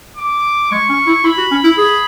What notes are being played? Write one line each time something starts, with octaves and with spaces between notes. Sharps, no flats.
D6
G#3 C#6
C#4
E4
E4 B5
F#4
C#4
E4
G#4